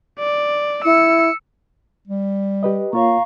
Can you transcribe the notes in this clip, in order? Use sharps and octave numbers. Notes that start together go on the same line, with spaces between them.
D5
E4 E6 C#7
G3
G4 B4 D#5
A#3 F4 C#5 F5 A#5 C#6